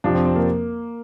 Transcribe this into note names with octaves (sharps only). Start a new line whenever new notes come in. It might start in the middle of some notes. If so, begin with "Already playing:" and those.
F2 C3 F3 D4
C4
C4
A#3